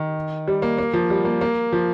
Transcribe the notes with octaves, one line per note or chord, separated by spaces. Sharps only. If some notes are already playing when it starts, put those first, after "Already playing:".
Already playing: D#3
G3
A#3
A#3
F3
G3
A#3
A#3
F3